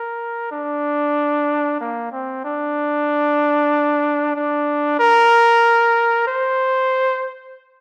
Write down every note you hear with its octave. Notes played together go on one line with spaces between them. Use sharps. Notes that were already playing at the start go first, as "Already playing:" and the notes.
Already playing: A#4
D4
A#3
C4
D4
D4
A#4
C5